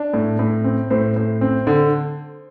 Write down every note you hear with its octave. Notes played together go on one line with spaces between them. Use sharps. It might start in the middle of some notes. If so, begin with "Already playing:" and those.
Already playing: D4
A2
A2
C4
A2 C5
A2
C4
D3